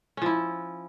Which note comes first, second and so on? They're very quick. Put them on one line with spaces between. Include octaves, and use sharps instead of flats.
C#4 F3 E4